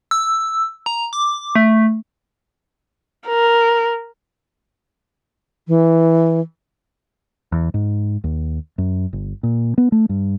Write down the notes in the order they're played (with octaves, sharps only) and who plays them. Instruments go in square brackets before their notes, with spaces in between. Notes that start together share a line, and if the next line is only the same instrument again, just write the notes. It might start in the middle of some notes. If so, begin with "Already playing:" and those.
[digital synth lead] E6
A#5
D6
A3
[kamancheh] A#4
[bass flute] E3
[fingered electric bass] E2
G#2
D#2
F#2
G1
A#2
B3
A3
G2